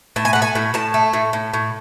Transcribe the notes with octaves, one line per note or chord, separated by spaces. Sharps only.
A2 A5
G#5
A3 F#5
G#5
A2
A2 A5
A3
A2
A2
A2